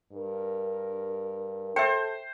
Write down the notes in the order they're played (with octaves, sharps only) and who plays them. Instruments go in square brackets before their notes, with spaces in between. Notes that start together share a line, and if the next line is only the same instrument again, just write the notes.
[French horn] G2 [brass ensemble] A#4
[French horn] A4 [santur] C5 [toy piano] E5 G5